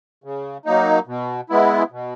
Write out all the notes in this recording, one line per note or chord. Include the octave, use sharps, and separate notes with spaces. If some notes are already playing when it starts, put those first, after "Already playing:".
C#3
F#3 A#3 D#4
B2
G#3 B3 E4
B2